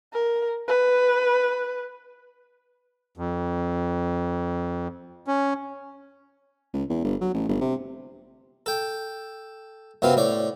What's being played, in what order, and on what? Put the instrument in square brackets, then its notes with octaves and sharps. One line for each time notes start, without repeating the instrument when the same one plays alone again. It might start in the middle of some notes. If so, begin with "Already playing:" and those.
[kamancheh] A#4
B4
[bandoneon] F2
C#4
[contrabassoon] C#2
E2
G1
F#3
A1
G1
C3
[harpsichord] A4 G5
F#2 C3 B3 C4 F4
A2 C#5 D5